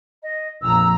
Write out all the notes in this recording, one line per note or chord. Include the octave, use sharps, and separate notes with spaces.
D#5
A#1 F2 A#5 E6